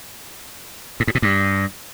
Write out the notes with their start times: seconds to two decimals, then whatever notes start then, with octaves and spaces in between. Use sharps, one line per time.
1.00 A2
1.07 G#2
1.15 B2
1.22 G2